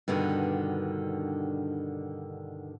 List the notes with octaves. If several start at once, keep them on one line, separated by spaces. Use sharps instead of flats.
G2 B2 D3 D#3